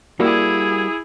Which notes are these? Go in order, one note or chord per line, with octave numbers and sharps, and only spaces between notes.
G3 A#3 E4 F#4 G#4